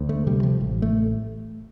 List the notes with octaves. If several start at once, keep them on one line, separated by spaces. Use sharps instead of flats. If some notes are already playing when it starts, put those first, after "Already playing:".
Already playing: D2
A3
C3 G3
F3
A1
A3